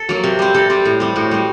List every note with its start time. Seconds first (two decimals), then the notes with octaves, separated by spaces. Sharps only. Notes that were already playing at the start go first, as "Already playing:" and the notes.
Already playing: A4
0.09 F#3 A#3
0.23 C3
0.39 G3 C4
0.54 C3 A4
0.70 G3 C4
0.85 A2
1.00 G3 C4
1.16 A2 F#4
1.31 G3 C4